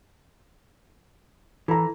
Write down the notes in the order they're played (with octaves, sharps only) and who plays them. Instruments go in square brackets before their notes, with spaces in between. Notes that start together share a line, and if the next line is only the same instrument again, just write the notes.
[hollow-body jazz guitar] E3 [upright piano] A4 A#5